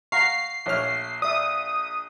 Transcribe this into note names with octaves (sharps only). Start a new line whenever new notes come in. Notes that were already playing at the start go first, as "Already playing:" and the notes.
F5 F#5 A#5 C#6 C7
A#1 C#5 E5 F6
D5 E5 D#6